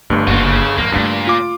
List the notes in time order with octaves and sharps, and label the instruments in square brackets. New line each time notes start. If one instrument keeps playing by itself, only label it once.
[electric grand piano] G1 G2 [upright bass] A3
[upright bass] F#1 C#2 [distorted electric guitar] F4 F#4
[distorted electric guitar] C#3
[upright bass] A2 F3 [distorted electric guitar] A#3
[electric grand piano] G2 [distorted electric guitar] A#2 [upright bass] C#3 A3
[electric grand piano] F4 D6